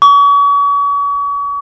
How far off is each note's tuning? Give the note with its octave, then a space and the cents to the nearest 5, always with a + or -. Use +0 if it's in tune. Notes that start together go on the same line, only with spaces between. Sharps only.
C#6 +40